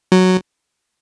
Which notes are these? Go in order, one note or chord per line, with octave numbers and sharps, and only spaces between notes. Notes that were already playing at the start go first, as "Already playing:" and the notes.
F#3